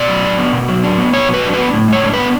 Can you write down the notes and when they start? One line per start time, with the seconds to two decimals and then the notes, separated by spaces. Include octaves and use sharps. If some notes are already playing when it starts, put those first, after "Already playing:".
Already playing: B2 D5
0.08 F#3
0.23 D4
0.38 B3
0.53 B2
0.68 F#3
0.83 D4
0.98 B3
1.13 B2 C#5
1.28 F#3
1.34 B4
1.43 D4
1.54 B3 B4
1.74 A2
1.88 G#3 C#5
2.03 D4
2.14 B3 B4